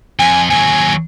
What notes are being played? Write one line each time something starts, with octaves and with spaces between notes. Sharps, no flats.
F2 G#5
D#2 F#3 G#5